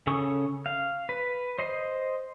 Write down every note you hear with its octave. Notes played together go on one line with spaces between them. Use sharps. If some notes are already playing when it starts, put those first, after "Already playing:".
C#3 C#4 A4 C#6 D#6
F5
B4
C5 D#5 C6